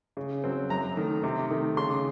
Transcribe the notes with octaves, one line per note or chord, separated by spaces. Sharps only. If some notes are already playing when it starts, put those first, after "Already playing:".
C#3
F#3 C4
F#2 A#5
D#3 A3
C3
D#3 A3
C#3 C6